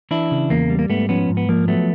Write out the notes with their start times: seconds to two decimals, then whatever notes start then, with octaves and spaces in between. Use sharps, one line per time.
0.11 E3 D4 E4
0.31 C#3
0.50 E2 A#3
0.70 G3
0.79 A#3
0.89 G#2 A3 B3
1.09 F3 B3 C#4
1.29 G#2
1.37 B3
1.49 F3 A#3
1.68 F#3 A3 B3